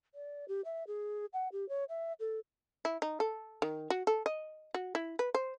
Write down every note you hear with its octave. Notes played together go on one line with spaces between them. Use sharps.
D5
G4
E5
G#4
F#5
G4
C#5
E5
A4
E4
D#4
A4
D#3
F#4
A4
D#5
F#4
E4
B4
C5